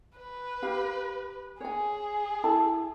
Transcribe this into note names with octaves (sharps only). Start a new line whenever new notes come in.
B4
G4 F5
G#4 C#5 G#5
E4 A4 A5